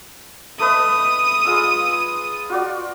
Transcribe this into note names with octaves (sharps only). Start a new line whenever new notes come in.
A3 B4 D#5 D#6
G#3 F4 E6
F4 F#4 D5